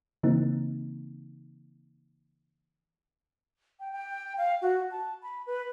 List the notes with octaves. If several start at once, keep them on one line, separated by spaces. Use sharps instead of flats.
C#3 E3 A#3 C4 D#4
G5
G5
F5
F#4
A5
B5
B4